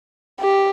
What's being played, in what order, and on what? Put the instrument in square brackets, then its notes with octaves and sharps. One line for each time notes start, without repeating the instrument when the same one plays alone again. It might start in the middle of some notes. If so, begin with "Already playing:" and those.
[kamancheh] G4